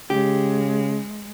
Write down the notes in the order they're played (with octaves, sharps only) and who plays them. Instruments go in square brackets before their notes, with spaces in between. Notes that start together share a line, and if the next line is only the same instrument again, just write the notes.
[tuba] C#3 [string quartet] G#3 [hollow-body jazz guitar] G4